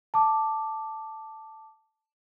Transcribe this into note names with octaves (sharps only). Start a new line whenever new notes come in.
A5 D6